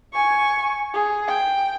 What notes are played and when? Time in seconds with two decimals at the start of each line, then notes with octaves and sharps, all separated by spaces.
0.13 G#5 C#6
0.94 G#4
1.27 G5